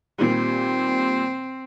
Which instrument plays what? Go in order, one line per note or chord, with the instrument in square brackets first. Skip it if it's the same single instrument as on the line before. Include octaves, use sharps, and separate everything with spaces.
[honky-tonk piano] A#2 D#3 G3 [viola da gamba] C4